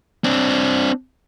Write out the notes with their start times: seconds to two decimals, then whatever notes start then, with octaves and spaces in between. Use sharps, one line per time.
0.24 C4 D4